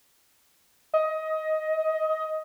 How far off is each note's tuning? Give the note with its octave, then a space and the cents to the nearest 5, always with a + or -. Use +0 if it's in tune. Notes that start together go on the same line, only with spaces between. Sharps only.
D#5 +20